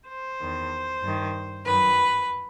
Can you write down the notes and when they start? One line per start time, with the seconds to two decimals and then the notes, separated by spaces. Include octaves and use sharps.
0.09 C5
0.40 E2 D#3
1.03 G2 D#3
1.65 F#2 D#3 B4